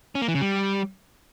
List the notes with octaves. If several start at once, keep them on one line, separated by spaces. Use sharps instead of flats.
C#4
A#3
E3
C#3
G3